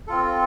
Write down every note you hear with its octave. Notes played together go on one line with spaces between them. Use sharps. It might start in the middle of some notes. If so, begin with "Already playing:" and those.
C4 F4 A4